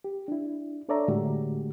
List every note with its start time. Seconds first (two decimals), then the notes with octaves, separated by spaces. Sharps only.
0.04 G4
0.28 D4 E4
0.88 D4 A4 C#5 D5 E5 A#5
1.08 A2 D3 G#3 A3 F#4 G4